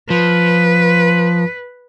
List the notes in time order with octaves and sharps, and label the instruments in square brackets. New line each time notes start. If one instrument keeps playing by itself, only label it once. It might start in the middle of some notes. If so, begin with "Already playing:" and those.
[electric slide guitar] F3 [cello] B4